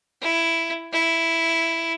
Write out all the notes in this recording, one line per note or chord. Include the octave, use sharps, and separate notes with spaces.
E4
E4